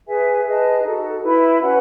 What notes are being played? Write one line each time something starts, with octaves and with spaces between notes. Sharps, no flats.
G#4 B4 E5 G#5
G#4 B4 D#5 A5
D#4 F#4 A4
E4 B4 E5 B5
C#4 F#4 B4 F#5